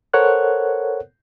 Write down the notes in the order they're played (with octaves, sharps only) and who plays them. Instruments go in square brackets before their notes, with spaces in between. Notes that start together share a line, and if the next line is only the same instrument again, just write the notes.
[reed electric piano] A4 A#4 C5 C#5 F#5 F#6